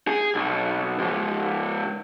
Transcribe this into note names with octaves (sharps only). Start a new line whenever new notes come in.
G#4
B1
C#2 G#2